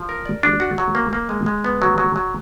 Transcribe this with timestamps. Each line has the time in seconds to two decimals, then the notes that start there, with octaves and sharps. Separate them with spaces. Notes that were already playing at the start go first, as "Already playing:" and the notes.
Already playing: F3
0.09 A#4
0.26 D5
0.43 D4
0.60 F#4
0.78 F#3
0.95 A#3
1.13 A#3
1.29 G#3
1.46 G#3
1.64 B3
1.82 F#3
1.98 F#3
2.16 F#3